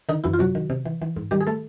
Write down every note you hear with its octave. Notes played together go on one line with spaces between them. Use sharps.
D3 D#3 D#4
F#2 E3 E4
F4
C3 F#3 F#4
D#3
C3
E3
E3
G#2
D#3 G3 G4
G#4
A3 A4